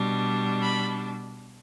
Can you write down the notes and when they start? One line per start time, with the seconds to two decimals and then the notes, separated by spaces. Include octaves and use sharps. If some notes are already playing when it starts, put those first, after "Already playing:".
Already playing: B2 G3 D4
0.62 B5